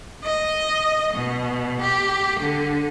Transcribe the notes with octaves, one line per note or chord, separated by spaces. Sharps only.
D#5
B2
G4
D3